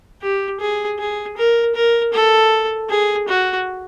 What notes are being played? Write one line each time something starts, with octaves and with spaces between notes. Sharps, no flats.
G4
G#4
G#4
A#4
A#4
A4
G#4
F#4